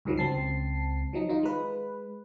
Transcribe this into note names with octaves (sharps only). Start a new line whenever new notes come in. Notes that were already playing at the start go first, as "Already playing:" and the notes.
C#2 G2 D#3 F3 F#3
C#2 C4 A5 C7
F3 F#3 D#4
D#3 D#4 F4
G#3 B4